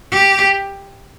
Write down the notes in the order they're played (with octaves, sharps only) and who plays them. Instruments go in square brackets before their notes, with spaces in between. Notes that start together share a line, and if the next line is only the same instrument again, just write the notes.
[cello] G4